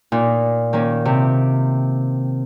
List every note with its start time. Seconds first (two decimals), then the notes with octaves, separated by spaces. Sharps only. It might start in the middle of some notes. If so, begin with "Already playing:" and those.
0.12 A#2 D#4
0.73 D#3 A#3 C#4
1.05 C3